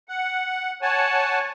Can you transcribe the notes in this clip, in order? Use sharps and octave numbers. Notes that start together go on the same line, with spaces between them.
F#5
C#5 F#5 G#5 A5